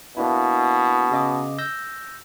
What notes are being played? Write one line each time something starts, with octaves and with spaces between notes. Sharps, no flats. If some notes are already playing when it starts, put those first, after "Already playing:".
B2 A#3 D4 E4
C#3 D#5 D6
E6 G6 A#6